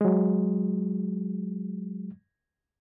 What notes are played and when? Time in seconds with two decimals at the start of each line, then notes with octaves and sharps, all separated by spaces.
0.01 F#3 G#3